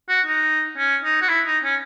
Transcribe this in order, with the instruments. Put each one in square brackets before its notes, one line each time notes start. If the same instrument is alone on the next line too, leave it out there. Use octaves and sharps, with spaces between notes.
[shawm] F#4
D#4
C#4
D#4
F#4
E4
D#4
C#4